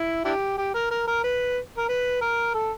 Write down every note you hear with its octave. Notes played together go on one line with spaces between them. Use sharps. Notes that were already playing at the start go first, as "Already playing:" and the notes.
Already playing: E4
D4 E4 G4
G4
A#4
A#4
A#4
B4
A#4
B4
A#4
A4